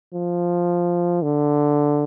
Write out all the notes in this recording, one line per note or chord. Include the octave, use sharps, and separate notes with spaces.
F3
D3